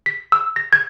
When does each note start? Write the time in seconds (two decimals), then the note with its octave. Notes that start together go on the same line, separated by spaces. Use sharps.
0.06 B6
0.32 E6
0.56 A#6
0.73 G#6